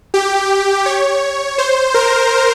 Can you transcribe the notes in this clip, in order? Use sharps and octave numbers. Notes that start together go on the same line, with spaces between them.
G4
C#5
C5
A#4